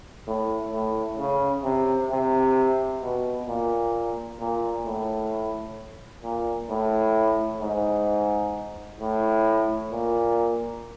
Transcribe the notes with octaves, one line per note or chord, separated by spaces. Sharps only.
A2
A2
C#3
C3
C3
B2
A#2
A#2
A2
A#2
A2
G#2
A2
A#2